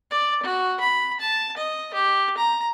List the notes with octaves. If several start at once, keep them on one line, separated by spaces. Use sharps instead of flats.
D5
F#4
B5
A5
D#5
G4
A#5